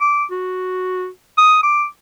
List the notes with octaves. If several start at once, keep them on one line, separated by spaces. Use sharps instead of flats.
D6
F#4
D#6
D6